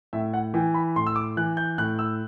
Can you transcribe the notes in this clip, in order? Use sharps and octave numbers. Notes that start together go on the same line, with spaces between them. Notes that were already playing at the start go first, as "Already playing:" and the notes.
A2 E5
F#5
E3 G5
B5
A2 C6
E6
D6
E3 F#6
G6
A2 F#6
E6